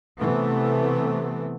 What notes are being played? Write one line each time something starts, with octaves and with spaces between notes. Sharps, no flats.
C3 E3 A3 B3